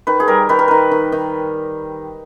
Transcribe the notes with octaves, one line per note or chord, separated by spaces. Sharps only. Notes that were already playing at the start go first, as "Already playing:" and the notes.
D#3 B4
G#4
G3 A#4
D#3 B4
A#4
D#3 B4
D#3
D#3